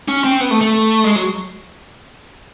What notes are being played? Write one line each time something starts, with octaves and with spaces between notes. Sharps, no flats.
C#4
C4
B3
A3
A3
G#3
F#3